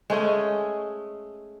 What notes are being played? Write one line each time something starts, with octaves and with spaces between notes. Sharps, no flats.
G#3 A3 C#4 D#5